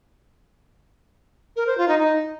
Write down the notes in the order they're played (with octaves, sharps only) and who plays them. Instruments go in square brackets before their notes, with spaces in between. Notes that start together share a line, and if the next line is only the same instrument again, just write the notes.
[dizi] A#4
C5
F4
D#4
D#4